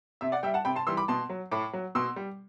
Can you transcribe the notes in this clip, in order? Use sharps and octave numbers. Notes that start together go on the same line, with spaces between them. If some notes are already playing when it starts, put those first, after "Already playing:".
C3 E5
D5 F#5
G3 E5 G5
F#5 A5
C3 G5 B5
A5 C6
E3 G3 C6 E6
B5 D6
B2 A5 C6
F#3
A2 B5 D6
F#3
B2 C6 E6
G3